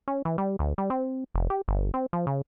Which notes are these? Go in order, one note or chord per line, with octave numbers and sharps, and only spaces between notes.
C#4
E3
G3
D2
G3
C4
F1
G4
G1
C4
F3
C#3